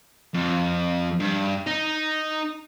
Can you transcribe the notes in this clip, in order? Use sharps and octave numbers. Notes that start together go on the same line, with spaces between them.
F2
G2
D#4